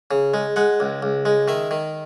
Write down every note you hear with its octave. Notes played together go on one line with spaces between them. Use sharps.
C#3
G#3
G#3 F#5
C#2
C#2
G#3
D#3 E5
D#3